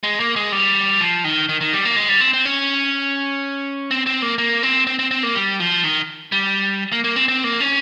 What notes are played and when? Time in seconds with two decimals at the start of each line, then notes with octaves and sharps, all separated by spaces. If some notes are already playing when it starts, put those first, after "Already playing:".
0.03 G#3
0.20 A#3
0.36 G#3
0.52 G3
1.01 F3
1.24 D#3
1.49 D#3
1.61 D#3
1.73 G3
1.85 A#3
1.96 G#3
2.09 G3
2.20 C4
2.33 C4
2.45 C#4
3.91 C4
4.06 C4
4.22 A#3
4.38 A#3
4.63 C4
4.87 C4
4.99 C4
5.11 C4
5.23 A#3
5.35 G3
5.60 F3
5.84 D#3
6.32 G3
6.92 A#3
7.04 A#3
7.16 C4
7.28 C4
7.44 A#3
7.60 C#4